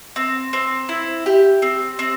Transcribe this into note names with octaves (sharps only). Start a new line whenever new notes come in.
C4
C4
E4
G4
C4
C4